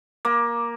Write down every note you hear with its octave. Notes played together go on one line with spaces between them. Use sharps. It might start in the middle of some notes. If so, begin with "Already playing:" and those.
A#3